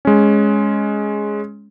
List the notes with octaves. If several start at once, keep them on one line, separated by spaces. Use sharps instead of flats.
G#3 C#4